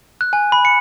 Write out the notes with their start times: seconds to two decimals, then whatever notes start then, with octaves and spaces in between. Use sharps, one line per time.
0.21 F#6
0.33 G#5
0.52 B5
0.65 C#7